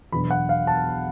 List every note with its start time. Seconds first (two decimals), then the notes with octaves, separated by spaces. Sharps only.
0.12 E2 B2 F#3 B3 D4 B5
0.31 F#5
0.49 F5
0.67 A5